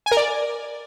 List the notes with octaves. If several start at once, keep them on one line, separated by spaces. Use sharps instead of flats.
G#5
A#4
D5